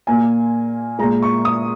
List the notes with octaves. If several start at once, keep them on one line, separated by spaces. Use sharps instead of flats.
A#2 A#3 G#5
A#2 G#3 A#5
C#6
D#6